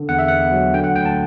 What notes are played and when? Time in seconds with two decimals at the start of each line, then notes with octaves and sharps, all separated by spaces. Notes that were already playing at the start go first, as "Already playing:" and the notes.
Already playing: D3
0.09 E2 F#5
0.19 E5
0.28 B3 F#5
0.52 F#3
0.74 D3 G5
0.84 F#5
0.95 D2 G5
1.06 A5